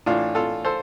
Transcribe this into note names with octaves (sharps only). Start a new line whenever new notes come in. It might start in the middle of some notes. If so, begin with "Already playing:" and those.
A2 E3 D4 F4
F4 A4
A4 C5